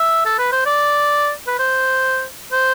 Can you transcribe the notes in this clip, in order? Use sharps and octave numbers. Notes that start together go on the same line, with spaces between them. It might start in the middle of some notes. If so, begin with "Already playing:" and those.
Already playing: E5
A4
B4
C5
D5
B4
C5
C5